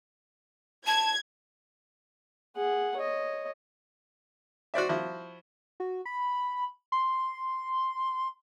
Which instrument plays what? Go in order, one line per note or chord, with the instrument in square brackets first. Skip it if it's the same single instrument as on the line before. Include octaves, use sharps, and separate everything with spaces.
[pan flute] A5 [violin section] G#6
[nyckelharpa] G#4 F#5
C#5 D#5
[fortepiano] F#4 C5 D5 E5
F3 E4 F#4
[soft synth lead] F#4
B5
C6